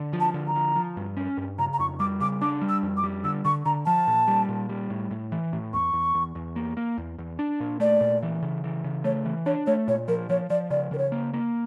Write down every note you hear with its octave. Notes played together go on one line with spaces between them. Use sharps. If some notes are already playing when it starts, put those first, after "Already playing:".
Already playing: D3
F3
A5
D3
A#5
F3
F3
G2
C#4
G2
C#3 A#5
A#5
F2 C#6
G3 D6
C#3 D6
D4 D6
G3
E6
F2
D6
G3
D3 E6
D3 C#6
D3 A#5
F3 A5
A#2
G3
A#2
G3
A2
A2
E3
A2
E2 C#6
E2
E2
E2
A#3
A#3
E2
E2
D4
A#2
A3 D5
A#2
E3
C#3
E3
C#3
A3 C#5
E3
D4 C#5
A3 C#5
A#2 C#5
F3 A#4
F3 C#5
F3 D5
C#3 D5
C#3 A#4
C#5
A#3
A#3